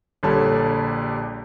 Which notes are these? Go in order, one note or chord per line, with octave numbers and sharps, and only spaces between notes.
A#1 D3 G3 C#5 A5